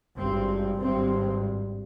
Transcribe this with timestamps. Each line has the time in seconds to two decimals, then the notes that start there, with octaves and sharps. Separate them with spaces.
0.16 G#1 G2 C4
0.79 G#1 G2 C4